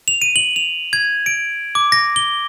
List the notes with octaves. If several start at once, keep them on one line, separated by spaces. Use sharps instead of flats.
F7
D#7
F#7
F7
G#6
D7
D6
A#6
G7